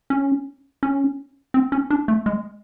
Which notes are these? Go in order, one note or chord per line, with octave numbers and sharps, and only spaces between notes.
C#4
C#4
C4
C#4
D4
A3
G#3